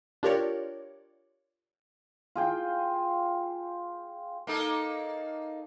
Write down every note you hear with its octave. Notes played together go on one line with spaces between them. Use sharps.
D4 F4 G4 A#4 C#5 D5
F4 G#4 G5
A#3 D#4 A4